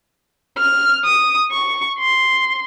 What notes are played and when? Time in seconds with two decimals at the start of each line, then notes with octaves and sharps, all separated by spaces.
0.58 F6
1.05 D#6
1.51 C#6
1.99 C6